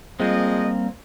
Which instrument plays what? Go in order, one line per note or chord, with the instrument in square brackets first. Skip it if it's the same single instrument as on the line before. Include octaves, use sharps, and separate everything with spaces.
[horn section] F3 G#3 D#5 [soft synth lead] G3 [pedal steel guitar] A#3 C4